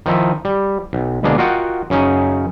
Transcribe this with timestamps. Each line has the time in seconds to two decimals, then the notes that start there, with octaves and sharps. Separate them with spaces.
0.06 D#3 F3 D#4 E4
0.45 G3
0.93 B1
1.23 D2 B2 G#3 A#3 D4
1.38 F4 F#4 A#4 D#5 F#5 G5
1.90 F#2 C#3 C#4 D#4